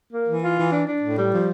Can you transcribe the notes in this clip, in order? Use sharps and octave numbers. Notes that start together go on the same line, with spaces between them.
A#3
E3
F4
E3
D4
D4
A2
G3
F3